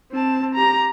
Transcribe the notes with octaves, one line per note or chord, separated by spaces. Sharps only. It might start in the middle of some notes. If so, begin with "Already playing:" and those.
C4 A5
G4 A#5